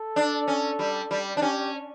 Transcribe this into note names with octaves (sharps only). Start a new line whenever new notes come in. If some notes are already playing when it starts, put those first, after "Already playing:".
Already playing: A4
D4
C#4
G3
G3
D4
C#4 G4